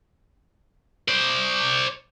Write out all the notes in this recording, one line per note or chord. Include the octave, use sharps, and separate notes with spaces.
C5 D5